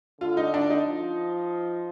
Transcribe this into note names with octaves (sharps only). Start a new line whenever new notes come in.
D3 F4
D#4
D4
D#4
F3